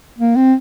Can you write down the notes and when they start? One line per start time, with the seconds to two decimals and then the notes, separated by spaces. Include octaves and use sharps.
0.18 A#3
0.36 C4